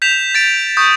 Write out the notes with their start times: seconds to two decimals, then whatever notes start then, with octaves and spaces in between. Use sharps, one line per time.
0.02 G6 B6 E7 F7
0.35 A6 D7
0.77 C#6 D#6 G6